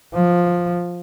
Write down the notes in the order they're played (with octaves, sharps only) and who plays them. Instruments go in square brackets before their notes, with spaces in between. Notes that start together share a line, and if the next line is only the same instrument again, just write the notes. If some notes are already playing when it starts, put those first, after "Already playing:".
[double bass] F3